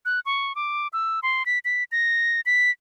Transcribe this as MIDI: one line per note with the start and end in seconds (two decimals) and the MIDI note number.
0.05 0.20 90
0.26 0.55 85
0.56 0.88 86
0.93 1.20 88
1.23 1.46 84
1.46 1.59 95
1.65 1.84 95
1.92 2.41 94
2.46 2.71 95